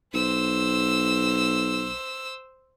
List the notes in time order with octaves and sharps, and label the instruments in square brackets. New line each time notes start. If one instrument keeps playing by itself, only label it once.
[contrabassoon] B1 [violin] C5 E6